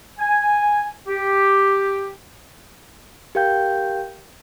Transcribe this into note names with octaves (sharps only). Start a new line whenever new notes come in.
G#5
G4
G4 A#4 F5 G5 G6